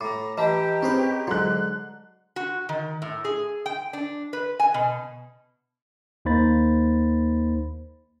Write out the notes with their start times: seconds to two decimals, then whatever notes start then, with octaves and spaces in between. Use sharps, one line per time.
0.01 A2 A#5 D6
0.38 E3 G4 D#5 A5 A#5
0.82 C4 C#4 G#4 B4
1.27 G#2 D3 F#3 F#6
2.36 F#4
2.69 D#3
3.02 A2
3.25 G#4
3.66 G5
3.93 D4
4.33 B4
4.60 G#5
4.74 B2
6.25 D#2 A#3 D#4 C5 B5 A6